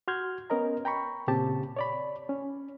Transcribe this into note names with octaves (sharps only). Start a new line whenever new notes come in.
F#4 C6 F6 G6 G#6
B3 C#4 A#4 D#5 A#5
G5 A#5 B5 C#6
A#2 C#3 C4 G4 A5
C#5 D5 B5
C#4